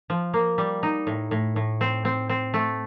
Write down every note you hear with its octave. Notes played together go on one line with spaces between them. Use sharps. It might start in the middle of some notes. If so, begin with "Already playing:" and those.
F3
A#3
G3
D#4
A2
A2
A2
C4
C4
C4
A3